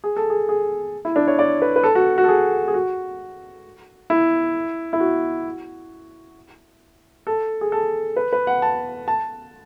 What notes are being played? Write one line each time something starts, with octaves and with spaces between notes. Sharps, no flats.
G#4
A4
G#4
G#4
E4
D4
C#5
D5
B4
B4
A4
F#4
F#4
A4
G#4
G#4
F#4
E4
E4
F#4
A4
G#4
A4
B4
B4
F#5
A5
A5